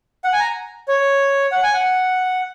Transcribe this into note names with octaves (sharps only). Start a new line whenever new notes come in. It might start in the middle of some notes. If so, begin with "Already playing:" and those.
F#5
G#5
A#5
C#5
F#5
G#5
F#5